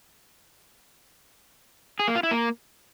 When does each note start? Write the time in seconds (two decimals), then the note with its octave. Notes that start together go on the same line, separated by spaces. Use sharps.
1.99 G#4
2.07 A#3
2.15 F4
2.23 E4
2.31 A#3